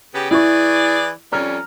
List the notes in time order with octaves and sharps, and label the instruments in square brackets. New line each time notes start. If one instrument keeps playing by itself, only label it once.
[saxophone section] C#3 B3 G4
[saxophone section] E3 G#4 D5 [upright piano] E4 C#6
[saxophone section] F2 G3 C#4 [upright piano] A#5 F6